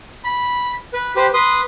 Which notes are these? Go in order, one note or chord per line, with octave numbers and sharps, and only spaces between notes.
B5
B4
G4 B4 C5
B4 C6 D#6